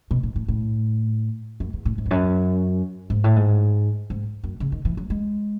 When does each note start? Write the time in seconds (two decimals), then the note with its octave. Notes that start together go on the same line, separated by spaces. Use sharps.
0.11 B2
0.23 A2
0.36 A2
0.48 A2
1.60 F#2
1.73 E2
1.85 A2
1.98 G#2
2.06 E2
2.11 F#2
3.10 G#2
3.24 A2
3.36 G#2
4.10 G#2
4.44 F#2
4.60 C#3
4.72 D#3
4.85 E3
4.97 F#3
5.10 G#3